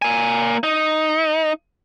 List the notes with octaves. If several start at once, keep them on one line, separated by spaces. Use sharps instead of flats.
A#3 G#5
D#4